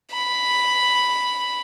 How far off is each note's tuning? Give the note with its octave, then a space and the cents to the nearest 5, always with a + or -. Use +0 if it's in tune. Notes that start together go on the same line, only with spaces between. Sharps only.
B5 +0